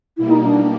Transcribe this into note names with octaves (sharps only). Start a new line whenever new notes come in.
B2 G3 A#3 E4
D#4
D4